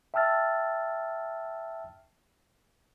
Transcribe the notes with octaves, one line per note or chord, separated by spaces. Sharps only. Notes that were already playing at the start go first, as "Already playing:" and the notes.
E5 G5 A5 E6 F6 A6